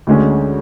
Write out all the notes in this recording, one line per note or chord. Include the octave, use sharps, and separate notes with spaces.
D2 D3 G#3 C#4